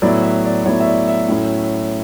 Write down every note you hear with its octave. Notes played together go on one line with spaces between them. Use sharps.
A2 F#3 B3 E4 D5
E5
D5
A2 F#3 B3 E4 C#5
E5
D5
E5
A2 F#3 C#4 E4